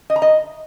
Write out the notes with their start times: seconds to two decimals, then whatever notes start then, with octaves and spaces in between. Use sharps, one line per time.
0.10 D#5
0.16 A#5
0.22 D#5